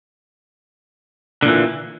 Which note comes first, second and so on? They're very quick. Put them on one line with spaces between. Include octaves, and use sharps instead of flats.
D3 A#2 E3